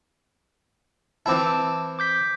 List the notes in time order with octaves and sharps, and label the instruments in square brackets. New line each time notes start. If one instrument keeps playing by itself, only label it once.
[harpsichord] E3 C4 E4 [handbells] A5 D6
[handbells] D6 G6 B6